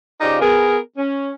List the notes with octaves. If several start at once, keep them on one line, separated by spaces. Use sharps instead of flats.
C#3 D#4 F4 G4 C5 D5
B3 G#4 A#4
C#4